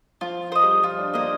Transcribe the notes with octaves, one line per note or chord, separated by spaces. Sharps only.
F3 F4
C5 D#5
G3
F3 F4
D4
A#3 C5 D#5